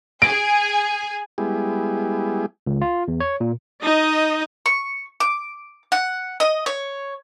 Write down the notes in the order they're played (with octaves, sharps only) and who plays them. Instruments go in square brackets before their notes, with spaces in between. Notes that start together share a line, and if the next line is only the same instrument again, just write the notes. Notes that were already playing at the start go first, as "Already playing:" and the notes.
[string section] G#4 G#5 [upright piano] D7
[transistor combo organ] G3 G#3 B3 E4 G4 G#4
[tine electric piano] C#2
F4
E2
C#5
A#2
[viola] D#4 D#5
[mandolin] C#6
D6
F#5
D#5
C#5